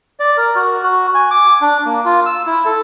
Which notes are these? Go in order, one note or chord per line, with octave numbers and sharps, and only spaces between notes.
D5
A#4
F#4
F#4
G#5
D6
D4
A#3
F4
E6
E4
A4